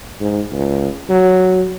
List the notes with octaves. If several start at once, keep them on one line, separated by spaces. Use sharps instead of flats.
G#2
C#2
F#3